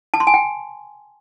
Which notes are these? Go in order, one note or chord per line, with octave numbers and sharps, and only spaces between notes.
A5
C6
G#5
G5